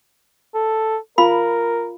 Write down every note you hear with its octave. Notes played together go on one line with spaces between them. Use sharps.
A4
F4 A#4 F5 B5